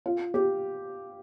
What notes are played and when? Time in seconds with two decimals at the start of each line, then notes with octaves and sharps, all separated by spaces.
0.06 F4
0.34 G4